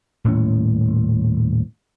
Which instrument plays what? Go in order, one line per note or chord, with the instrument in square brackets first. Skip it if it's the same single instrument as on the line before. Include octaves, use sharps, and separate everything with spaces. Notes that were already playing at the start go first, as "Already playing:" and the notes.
[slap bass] D#1 A2 A3 C#4